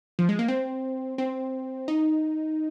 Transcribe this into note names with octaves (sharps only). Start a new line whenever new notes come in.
F3
G#3
A#3
C4
C4
D#4